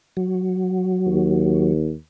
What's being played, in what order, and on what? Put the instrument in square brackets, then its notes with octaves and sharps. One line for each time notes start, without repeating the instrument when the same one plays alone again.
[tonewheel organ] F#3
[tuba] D#2